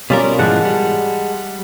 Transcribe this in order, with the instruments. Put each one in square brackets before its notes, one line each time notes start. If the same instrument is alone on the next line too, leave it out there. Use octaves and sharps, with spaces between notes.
[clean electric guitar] B2 G3 A#4 [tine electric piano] C#4 F4 D5
[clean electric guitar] G#2 E3 F3 [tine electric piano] G#3 F#5 A5
[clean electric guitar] G3